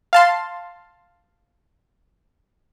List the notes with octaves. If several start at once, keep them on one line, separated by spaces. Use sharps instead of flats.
F5 A5 C6